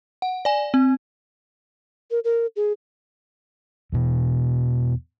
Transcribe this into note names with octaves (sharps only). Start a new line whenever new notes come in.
F#5
D5 G#5
C4
A#4
A#4
G#4
E2 B2 E3